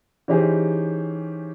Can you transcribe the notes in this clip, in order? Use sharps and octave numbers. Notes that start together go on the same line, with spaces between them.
E3 C#4 D#4 G4 G#4 C5